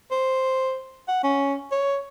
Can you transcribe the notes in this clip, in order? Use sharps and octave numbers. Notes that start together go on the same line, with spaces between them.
C5
F#5
C#4
C#5